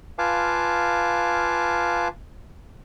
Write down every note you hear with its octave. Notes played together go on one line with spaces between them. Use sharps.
F4 B4 F5 G#5 A5 D6